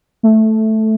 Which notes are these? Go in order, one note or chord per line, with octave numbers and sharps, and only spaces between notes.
A3